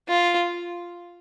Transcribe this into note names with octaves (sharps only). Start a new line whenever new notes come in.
F4